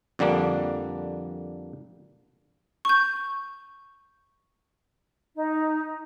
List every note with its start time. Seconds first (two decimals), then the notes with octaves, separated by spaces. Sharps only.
0.19 F2 D3 G3 A#3 D4
2.85 C#6 G6
5.34 D#4